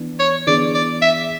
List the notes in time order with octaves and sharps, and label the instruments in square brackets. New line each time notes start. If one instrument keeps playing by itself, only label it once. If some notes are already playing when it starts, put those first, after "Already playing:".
Already playing: [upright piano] E3 B3 D4
[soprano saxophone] C#5
[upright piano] E3 B3 D4 G#4 [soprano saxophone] D5
[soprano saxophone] D5
E5